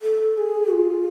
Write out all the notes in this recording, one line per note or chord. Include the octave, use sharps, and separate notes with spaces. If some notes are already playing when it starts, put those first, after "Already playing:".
A4
G#4
F4